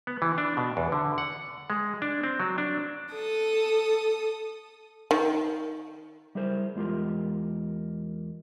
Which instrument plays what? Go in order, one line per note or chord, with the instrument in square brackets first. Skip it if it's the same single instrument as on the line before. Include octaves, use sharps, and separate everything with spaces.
[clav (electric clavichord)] B3
E3
D4
B2
E2
D3
F#5
G#3
D4
C4
F#3
D4
[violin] A4 D#6
[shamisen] D#3
[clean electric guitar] G3 E4 G#4 A#4 C5
E2 G#3 F4 G4 A#4